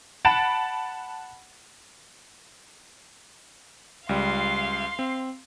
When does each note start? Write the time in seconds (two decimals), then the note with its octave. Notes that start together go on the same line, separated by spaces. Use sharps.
0.25 F#5 A5 B5 A6 D7 E7
4.09 C#2 G3 F5 C6
4.99 C4